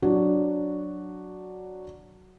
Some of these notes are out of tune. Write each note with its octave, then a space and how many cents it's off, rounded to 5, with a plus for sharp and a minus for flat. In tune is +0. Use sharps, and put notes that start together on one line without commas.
F#3 +0 D4 +0 F#4 +0